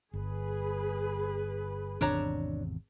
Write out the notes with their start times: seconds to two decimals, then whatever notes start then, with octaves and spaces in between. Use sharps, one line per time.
0.14 G1 G#4 B4
2.01 G#1 E2 C3 D4 C#5 A#5